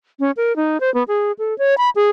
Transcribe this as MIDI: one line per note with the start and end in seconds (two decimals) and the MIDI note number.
0.20 0.31 61
0.37 0.56 70
0.56 0.80 63
0.80 0.92 72
0.94 1.03 59
1.08 1.32 68
1.39 1.57 69
1.58 1.77 73
1.78 1.90 83
1.96 2.10 68